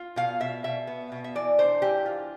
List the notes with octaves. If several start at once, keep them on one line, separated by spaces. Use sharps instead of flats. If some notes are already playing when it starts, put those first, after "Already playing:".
Already playing: F4
B2 F5
B2 E5
B2 E5
B3
B2
E5
E3 D5
D4 C5
E3 G4
F4